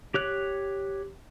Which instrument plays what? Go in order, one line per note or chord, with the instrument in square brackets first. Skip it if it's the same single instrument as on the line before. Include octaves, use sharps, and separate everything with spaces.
[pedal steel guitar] G4 C#5 F#6